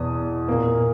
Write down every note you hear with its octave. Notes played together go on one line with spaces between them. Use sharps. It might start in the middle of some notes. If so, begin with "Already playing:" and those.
Already playing: E2 B2 D#6
A#2 A#3